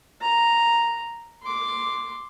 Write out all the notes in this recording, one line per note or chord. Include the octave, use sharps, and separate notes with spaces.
A#5
C6 D6